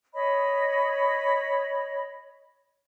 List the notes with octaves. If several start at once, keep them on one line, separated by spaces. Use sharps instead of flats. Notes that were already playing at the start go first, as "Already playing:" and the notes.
C#5 D#5 B5